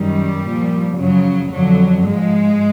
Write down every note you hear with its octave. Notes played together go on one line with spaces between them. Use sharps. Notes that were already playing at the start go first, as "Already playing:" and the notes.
Already playing: F#2 D#3 G3
A#2 F3
F#2 C#3 F3 F#3
F2 D3 F3 F#3
G#2 F3 G#3